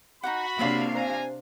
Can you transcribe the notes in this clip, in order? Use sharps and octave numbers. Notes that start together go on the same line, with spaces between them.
D#4 E4 F#4 F#5 B5
C3 A#3 D4 F4 C#5 E5 F5
C5 G#5 A#5